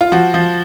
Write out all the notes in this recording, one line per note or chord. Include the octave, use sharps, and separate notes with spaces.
F4
F3 F#4
F3